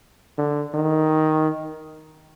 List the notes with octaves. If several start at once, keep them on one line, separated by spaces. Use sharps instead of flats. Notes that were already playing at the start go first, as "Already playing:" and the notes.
D3
D#3